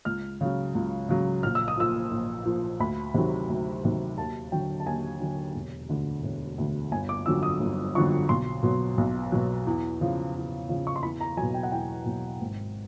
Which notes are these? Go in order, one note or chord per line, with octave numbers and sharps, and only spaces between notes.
C#2 F6
C#3 F#3
C#2
C#3 F#3
A#1 F6
E6
D#6
A#2 F3 E6
A#1
A#2 F3
D2 B5
C3 D#3 F#3
D2
C3 D#3 F#3
D#2 A5
D3 F#3 G5
A5
D#2 G#5
D3 F#3
E1
D2 D3
E1
D2 D3
G1 G#5
D6
F2 D3 F#3 E6
D#6
G1
F2 D3 F#3 C#6
B1 C6
B2 F#3
B1
B2 F#3
E2
C#3 F3
E2
C#3 F3
C#6
C6
E2 B5
A#5
F#3 G#5
B2
G5
F#5
E2 G5
B2 F#3
G#1